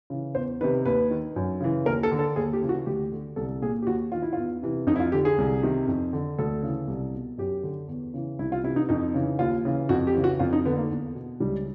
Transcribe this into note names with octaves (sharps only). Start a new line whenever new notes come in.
C#3 E3
E2 C5
C3 D#3 B4
D#2 B4
D#3
F#2
C#3 E3
D#2 A#4
A4
D3
A4
D#2 G#4
G4
C#3 E3
F#4
D2 G4
D3
C2 A4
A#2 G#4
G4
D#2 F#4
D#3 F4
E4
E2 F4
C3 E3
F2 D#4
E4
F4
D3 G4
G#4
C2
C3 D#3
F2
D3
D2 A4
C#3 E3
C2
B2
F#2 G4
D3
E2
C#3 E3
C2 E4
F4
C3 E3 E4
D#4
F2 D#4
C#3 E3
D#2 F4
C#3 E3
F2 F#4
G4
C#3 E3
F#4
F2 F4
D#4
D3 B3
A#3
E2
B2
C#2 G3